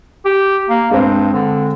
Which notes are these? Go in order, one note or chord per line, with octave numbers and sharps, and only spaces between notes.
G4
A#3
G2 G#3 C4
D3